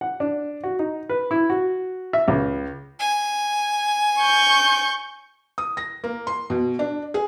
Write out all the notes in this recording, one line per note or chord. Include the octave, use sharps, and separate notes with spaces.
F#5
D4
F#4
D#4
B4
E4
F#4
E5
C#2
G#5
C#6 G6
D#6
A#6
A#3
C6
B2
D4
G#4